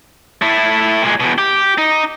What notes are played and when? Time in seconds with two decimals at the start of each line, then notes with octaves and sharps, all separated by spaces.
0.42 A3 E4
1.03 A#2 G#3
1.20 E2 B2
1.38 G4
1.78 D#4